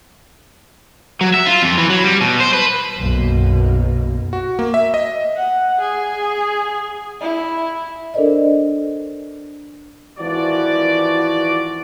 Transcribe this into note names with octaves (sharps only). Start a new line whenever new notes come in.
F#3
E5
F4
F2
E3
F#3
G3
B2
C5
B4
B1 F#2 B2 A#3
F#4
A#3
E5
D#5
F#5
G#4
E4
D4 A4 A#4 C5 D5 D#5
G#1 E3 F3 F#4 D5